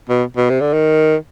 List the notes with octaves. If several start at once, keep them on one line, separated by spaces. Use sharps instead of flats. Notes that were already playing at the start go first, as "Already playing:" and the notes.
B2
B2
C3
D3
D#3